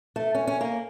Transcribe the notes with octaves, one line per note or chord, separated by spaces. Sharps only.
A3
C#4
C#4
A#3